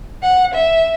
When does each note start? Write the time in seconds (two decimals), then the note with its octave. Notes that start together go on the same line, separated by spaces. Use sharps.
0.23 F#5
0.54 E5